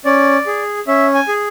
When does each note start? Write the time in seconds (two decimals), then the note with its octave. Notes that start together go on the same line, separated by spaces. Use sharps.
0.05 C#4 D5
0.47 G#4
0.87 C#4 E5
1.15 G#5
1.28 G#4